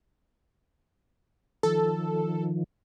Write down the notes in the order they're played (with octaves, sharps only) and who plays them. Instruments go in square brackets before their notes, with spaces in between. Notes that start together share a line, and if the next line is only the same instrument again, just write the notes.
[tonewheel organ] D#3 F3 [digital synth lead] A4